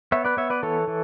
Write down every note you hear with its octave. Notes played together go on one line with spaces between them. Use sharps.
B3 C#5 E5
B4 D5
B3 C#5 E5
B4 D5
E3 A4 C#5
E3